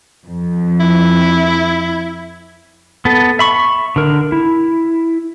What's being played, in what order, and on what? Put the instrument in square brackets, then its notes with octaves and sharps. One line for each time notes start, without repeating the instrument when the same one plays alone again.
[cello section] F2
[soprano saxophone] E4
[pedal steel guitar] B3 A4
E5 B5 C#6
D3 A#4
E4